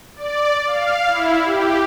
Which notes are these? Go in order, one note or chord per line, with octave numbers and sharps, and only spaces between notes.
D5
F5
E4
G4